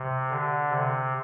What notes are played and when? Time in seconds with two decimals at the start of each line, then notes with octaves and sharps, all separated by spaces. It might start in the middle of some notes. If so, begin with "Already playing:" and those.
Already playing: C3
0.31 D3
0.71 C3